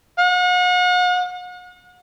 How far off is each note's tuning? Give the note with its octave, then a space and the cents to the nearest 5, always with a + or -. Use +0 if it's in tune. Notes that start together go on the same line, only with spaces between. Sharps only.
F#5 -40